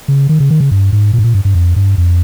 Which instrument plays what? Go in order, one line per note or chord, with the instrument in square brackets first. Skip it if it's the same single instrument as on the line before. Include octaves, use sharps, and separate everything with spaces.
[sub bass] C#3
D#3
C#3
D#3
C#3
G2
G#2
A#2
G#2
A#2
G2
G2
F2
G2
F2